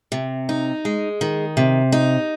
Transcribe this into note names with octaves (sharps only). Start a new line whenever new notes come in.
C3
D#4
G#3
D#3
C3
D#4